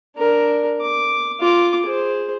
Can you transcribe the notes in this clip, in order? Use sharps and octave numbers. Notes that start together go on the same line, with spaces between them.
D4 A#4
D6
F4 D6
G#4 C5